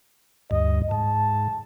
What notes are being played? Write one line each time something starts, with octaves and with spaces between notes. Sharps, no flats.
D2 G2 D#5
G#2 A5